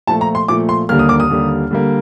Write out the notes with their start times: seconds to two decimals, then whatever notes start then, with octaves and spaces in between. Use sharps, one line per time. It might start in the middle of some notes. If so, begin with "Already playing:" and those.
0.07 A#2 F3 A3 A5
0.21 A#5
0.35 C6
0.48 A#2 F3 A3 D6
0.69 C6
0.89 D#2 D3 G3 A#3 F6
0.99 D#6
1.09 D6
1.20 D#6
1.30 D#2 D3 G3 A#3
1.71 D3 G3 A#3